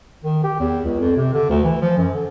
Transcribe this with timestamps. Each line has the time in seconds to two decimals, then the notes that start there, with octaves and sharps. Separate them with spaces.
0.24 D#3
0.44 G4
0.60 E2
0.85 C#2
0.99 F2
1.17 C3
1.33 D3
1.50 D2
1.64 E3
1.81 F3
1.98 F#2
2.14 D3